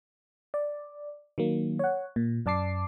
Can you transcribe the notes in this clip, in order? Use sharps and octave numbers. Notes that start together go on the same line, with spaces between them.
D5
D#3 F#3 A#3
C#5 F#5
A#2
F#2 D5 A5 D6 C7